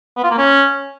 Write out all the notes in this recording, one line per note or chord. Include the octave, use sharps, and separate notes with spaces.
B3
F4
A#3
C#4